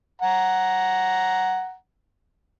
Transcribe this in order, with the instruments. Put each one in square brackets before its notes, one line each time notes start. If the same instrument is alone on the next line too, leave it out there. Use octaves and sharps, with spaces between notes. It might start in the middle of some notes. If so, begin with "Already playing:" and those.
[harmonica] F#5 A#5